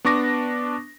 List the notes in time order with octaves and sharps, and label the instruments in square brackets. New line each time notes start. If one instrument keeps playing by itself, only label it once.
[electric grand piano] B3 D4 C#6 D6 A#6